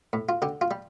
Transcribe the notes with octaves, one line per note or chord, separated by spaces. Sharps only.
A2
F4
D3 G4
F4
G3